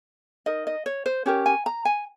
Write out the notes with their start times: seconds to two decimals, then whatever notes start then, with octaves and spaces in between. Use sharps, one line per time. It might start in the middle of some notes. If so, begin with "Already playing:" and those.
0.46 D#4 A#4 D#5
0.67 D#5
0.86 C#5
1.06 C5
1.26 C#4 G4 A#4 C#5
1.46 G#5
1.66 A#5
1.85 G#5